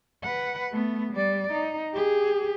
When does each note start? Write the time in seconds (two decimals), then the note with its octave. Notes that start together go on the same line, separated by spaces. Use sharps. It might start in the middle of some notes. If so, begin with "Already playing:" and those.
0.24 B4 F#5
0.72 A3 B3
1.13 G3 D5
1.52 D#4
1.94 G4 G#4